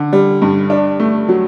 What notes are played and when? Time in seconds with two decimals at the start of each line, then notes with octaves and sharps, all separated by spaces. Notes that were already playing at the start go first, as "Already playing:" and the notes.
Already playing: D3
0.13 G3
0.42 G2
0.70 D4
1.00 A3
1.29 F#3